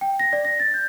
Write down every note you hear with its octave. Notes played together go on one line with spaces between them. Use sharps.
G5
A#6
D5
A#6
A6
G6